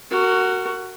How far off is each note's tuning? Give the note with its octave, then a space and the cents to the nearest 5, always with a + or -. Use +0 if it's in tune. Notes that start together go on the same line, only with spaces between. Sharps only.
F#4 +10 A#4 -25